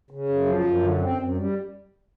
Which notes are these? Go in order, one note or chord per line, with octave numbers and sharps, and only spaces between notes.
C#3
F#2
F3
F#2
D3
C4
F#2
G3